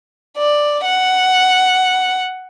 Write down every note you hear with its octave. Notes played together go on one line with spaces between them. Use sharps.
D5
F#5